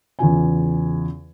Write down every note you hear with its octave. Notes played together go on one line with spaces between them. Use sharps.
E2 C#3 F4 G#5